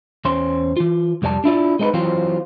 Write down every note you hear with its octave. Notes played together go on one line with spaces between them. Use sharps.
E2 C#4 C5 C6
E3 F4
C2 F2 G3 D5 A5
D4 E4 F4 D5
G#3 C4 D#4 E4 B4
E3 F#3 C4 F4 C5